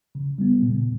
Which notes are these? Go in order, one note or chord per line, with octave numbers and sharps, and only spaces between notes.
C#3
G3 B3
A#2